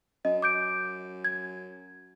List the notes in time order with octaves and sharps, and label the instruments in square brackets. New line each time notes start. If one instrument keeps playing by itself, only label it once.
[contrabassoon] F#2 [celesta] D#5
[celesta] D6 G6 D7
G#6